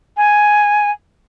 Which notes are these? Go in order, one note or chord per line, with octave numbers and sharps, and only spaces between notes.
G#5